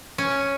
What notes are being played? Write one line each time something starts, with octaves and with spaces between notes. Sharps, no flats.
C#4